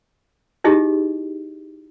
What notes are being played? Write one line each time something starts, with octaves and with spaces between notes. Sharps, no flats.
D#4 E4 G4 G#4 D#5